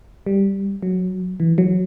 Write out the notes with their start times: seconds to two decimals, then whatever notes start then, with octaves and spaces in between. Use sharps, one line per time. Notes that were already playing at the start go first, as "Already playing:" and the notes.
0.26 G3
0.83 F#3
1.40 E3
1.58 F#3